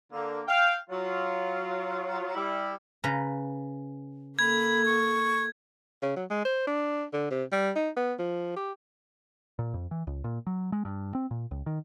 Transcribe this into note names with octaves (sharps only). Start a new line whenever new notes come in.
D3 A#3
F5 G5
F#3 F4
G3 E4
C#3 B4 A#5
A#3 A4 B5 G#6
C#6
C#3
F#3
G#3
C5
D4
D3
C3
G3
D#4
B3
F3
G4
A#2
F2
E3
C#2
A#2
F#3
G#3
G2
C4
A#2
C#2
D#3